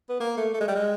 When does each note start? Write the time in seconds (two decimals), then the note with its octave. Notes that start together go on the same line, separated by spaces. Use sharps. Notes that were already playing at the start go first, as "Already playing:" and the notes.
0.10 B3
0.20 A#3
0.37 A3
0.54 A3
0.61 G#3
0.68 G3
0.75 G#3